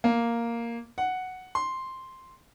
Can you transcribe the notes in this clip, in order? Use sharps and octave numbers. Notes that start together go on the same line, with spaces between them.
A#3
F#5
C6